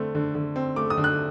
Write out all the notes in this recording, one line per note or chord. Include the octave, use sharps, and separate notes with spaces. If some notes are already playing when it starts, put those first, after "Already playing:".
Already playing: D3 A3 C4
D3
D3
C4
A3 D6
D#6
D3
F#6